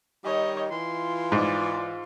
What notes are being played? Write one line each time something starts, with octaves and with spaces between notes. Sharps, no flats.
D#3 G3 C#5 D#5
E3 F4 C6
G#2 D5